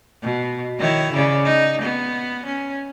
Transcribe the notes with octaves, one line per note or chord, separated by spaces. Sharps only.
B2
D#3 E4 C#5
C#3 D5
D#4
B3
C#4